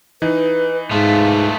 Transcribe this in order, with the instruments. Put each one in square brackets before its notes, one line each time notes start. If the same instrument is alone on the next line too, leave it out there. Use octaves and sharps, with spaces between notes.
[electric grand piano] E3 D#4 [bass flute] B4
[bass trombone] G#2 [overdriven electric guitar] A3 F4 [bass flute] F5